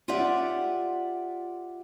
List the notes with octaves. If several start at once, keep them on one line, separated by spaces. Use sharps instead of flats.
F4 G4 D5 E5 F#5